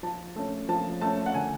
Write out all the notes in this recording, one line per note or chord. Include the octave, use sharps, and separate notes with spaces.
F3 A5
A3 C#4
F3 A5
A3 C#4 A5
F#5
D3 G#5